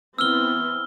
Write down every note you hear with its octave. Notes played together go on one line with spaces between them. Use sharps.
E3 B3 C4 E6 F6 G7